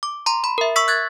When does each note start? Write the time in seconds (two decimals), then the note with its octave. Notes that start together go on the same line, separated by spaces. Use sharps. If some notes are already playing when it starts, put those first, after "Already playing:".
0.03 D6
0.26 A#5 C6
0.44 B5
0.58 A#4 E5
0.76 C#6 E6 B6
0.88 F#6 G#6 A6